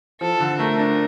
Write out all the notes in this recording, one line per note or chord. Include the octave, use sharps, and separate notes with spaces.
F3 A4
D3
A3 A#4
D4